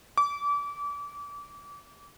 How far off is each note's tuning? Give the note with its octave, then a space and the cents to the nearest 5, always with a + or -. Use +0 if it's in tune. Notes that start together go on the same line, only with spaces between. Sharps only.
D6 -30